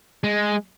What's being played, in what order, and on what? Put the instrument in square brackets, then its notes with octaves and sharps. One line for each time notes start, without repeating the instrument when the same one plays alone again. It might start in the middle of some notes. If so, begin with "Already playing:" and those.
[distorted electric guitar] G#3